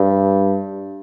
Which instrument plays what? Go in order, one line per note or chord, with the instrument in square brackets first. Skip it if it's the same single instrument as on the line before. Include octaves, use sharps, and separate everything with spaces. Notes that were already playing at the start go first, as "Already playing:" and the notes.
Already playing: [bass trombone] G2